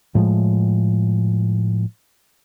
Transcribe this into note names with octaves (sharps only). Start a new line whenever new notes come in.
A2 F3 G#3